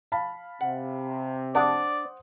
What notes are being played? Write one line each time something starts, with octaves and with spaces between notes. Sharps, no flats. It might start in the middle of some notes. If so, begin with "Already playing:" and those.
F5 A5 B5
C3 F#5
D4 C5 D5 F#5 D#6